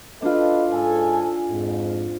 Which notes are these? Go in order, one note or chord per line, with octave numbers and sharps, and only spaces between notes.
D4 F4 A4 B4 D#5
G#2 A4 G#5
F2 G#2